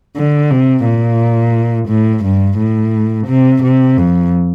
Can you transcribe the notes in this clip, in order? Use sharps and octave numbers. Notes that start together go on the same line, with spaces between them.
D3
C3
A#2
A2
G2
A2
C3
C3
F2